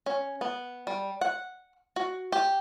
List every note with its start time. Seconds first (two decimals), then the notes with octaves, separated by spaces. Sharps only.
0.06 C#4
0.41 B3
0.87 G3
1.21 F#5
1.96 F#4
2.32 G4